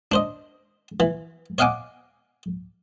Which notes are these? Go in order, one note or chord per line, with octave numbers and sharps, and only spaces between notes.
D4 C5 D#5
E3
C#5 D#5 F5 F#5 G#5 D6